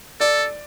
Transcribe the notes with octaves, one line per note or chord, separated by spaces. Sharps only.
A4 D5